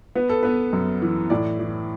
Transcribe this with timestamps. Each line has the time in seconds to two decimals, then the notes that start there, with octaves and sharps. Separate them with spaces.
0.15 B3 B4
0.29 A4
0.43 B3 B4
0.73 F#2
1.02 E3
1.30 A2 D5
1.59 E3